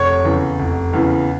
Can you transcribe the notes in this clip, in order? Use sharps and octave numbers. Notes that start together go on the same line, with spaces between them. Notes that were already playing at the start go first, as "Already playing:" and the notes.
Already playing: F1 C#5 C#6
E2 C#3 E3
F1
E2 C#3 E3